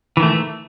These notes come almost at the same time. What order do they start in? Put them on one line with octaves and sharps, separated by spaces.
E3 D#3 A3